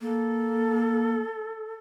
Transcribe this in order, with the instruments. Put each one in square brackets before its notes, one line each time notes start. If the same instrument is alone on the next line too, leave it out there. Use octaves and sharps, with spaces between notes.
[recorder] A#3 [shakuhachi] A4